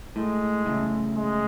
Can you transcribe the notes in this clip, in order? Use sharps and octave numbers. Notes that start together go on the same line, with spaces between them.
A2 G#3
A2 C#3
G#3